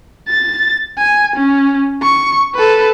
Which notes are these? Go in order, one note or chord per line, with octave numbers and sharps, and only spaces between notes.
A6
G#5
C#4
C#6
A4 B4